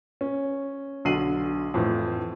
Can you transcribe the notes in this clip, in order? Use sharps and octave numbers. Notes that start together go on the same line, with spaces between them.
C#4
B1 D3 C7 D#7 F#7
F2 A2 E3